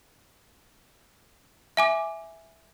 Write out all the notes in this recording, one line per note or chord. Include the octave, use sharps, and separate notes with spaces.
E5 G#5 D6